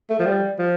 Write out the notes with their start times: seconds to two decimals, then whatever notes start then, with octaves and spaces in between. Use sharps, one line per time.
0.10 A3
0.19 F3
0.26 G3
0.59 F3